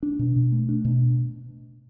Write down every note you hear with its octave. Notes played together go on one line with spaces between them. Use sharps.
D4
B2
B2
A3
D4
B2